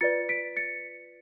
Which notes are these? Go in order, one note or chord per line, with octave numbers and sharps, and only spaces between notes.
F4 B4 D5 A6 C#7
B6 D7
A6 C#7